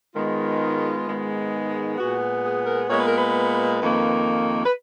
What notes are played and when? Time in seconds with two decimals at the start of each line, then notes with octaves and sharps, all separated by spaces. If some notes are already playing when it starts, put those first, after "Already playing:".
0.15 G#2 D#3 G#3 B3 F4
1.06 G#2 D#3 G#3 B3
1.98 A#2 G#3 B3 F#4
2.44 G#4
2.66 A#4
2.89 A#2 G#3 B3 C#5
2.98 B4
3.07 A#4
3.16 B4
3.80 F2 D#3 A#3
4.65 B4